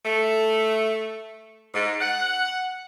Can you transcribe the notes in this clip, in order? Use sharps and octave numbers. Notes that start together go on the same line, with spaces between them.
A3
G#2
F#5